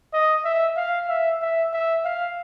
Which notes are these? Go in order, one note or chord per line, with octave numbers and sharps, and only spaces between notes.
D#5
E5
F5
E5
E5
E5
F5